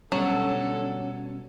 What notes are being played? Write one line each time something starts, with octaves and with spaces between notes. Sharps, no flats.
B2 D3 F#3 G3 C#4 A4